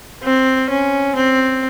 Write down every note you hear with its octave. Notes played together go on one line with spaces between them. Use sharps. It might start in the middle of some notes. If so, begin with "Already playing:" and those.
C4
C#4
C4